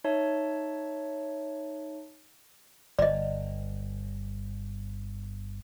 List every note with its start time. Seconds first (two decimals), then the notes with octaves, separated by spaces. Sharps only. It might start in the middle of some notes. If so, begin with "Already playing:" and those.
0.04 D#4 C#5 E5 A5
2.99 G1 D5 D#5